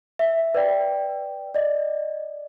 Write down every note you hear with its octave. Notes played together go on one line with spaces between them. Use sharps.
E5
B4 D5 G5
D5 D#5